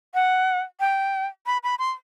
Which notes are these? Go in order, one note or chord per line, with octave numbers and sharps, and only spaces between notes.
F#5
G5
B5
B5
C6